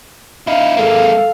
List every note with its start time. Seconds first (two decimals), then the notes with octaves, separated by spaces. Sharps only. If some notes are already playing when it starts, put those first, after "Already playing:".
0.47 D#4 E4 F5
0.77 G#3 A#3 A4 F5